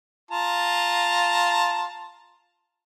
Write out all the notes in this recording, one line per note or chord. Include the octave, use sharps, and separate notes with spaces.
F4 A5 A#5